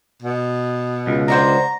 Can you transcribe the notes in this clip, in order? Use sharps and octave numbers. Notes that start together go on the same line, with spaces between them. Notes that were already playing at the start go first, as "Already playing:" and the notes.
B2
C#2
D4 F#4 C5 A#5